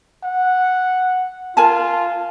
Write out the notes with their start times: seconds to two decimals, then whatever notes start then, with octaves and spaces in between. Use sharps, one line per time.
0.23 F#5
1.57 F4 A#4 G#5 A5